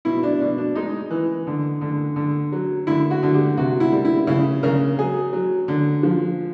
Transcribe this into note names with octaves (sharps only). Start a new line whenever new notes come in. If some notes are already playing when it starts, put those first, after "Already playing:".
B2 E4
D4
B2 D4
D4
G#3 D#4
E3
D3
D3
D3
F#3
D3 E4
F#4
D3
G4
C3 F#4
E4
G3
E4
C#3 E4
C#3 A#4
F#3 G#4
F#3
D3
F3